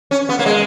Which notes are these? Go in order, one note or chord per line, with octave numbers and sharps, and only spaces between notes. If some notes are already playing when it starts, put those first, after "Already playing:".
C#4
B3
A#3
G#3